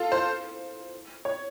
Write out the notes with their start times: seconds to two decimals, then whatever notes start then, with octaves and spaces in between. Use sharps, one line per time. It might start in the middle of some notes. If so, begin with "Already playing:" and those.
Already playing: F4 A4
0.12 C5
1.25 C#5